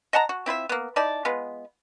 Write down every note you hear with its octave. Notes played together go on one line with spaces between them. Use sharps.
D#5 F#5 A5 A#5
F#4
C4 E4 F4 E5
A#3 B3
D#4 E4 D5 A5
G#3 B3 F4